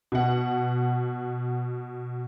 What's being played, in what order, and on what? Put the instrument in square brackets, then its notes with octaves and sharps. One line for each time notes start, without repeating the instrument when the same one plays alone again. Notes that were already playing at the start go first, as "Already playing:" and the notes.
[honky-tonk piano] B2 F#5